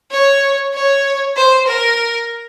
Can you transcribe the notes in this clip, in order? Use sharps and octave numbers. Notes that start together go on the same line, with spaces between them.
C#5
C#5
C5
A#4